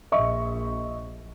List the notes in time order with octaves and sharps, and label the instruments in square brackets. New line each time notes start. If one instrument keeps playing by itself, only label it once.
[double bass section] A#1 [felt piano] D#5 E5 C#6